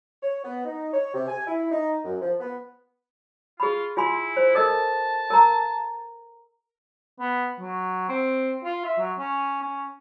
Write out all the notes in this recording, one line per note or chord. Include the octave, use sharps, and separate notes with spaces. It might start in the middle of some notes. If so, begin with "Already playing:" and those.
C#5
B3
D#4
C#5
C3
G#5
E4
D#4
F#2
F3
B3
F4 G#4 B5
E4 F4 G#5 C6
C5
A4 A#4 D#5 A5
A#4 A#5
B3
F#3
C4
F4
E5
F#3
C#4
C#4